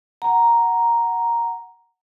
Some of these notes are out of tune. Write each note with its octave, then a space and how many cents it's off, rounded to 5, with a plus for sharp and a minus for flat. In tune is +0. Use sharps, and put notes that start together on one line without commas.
F#5 +0 A#5 +0